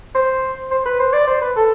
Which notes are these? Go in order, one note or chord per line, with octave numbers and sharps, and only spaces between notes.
C5
C5
B4
C5
D5
C5
B4
A4